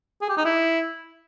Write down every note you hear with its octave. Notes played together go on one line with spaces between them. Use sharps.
G#4
G4
D#4
E4